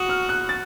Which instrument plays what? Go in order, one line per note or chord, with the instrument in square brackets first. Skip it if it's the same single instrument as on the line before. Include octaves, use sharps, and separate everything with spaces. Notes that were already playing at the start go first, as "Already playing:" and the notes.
Already playing: [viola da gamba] F#4 [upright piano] C#6 D#6
[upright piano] F6
F#6
A6